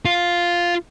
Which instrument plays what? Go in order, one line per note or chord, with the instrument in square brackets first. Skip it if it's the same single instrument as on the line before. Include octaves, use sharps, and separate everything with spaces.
[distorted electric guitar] F4